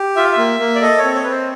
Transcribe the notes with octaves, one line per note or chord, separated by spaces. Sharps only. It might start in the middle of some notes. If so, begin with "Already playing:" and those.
Already playing: G4
F4 E5
F5
E5
A#3
A#3
D5
A4 D#5
C#5
C4
C#5
C4 B4
C5